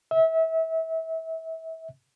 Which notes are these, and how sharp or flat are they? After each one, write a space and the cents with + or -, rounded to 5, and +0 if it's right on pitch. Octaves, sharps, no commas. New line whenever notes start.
E5 -30